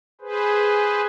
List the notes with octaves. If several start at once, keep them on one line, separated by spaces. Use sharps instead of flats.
G#4 B4 C5